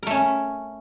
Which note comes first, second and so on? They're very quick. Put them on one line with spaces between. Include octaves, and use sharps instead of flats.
A#4 A3 C#4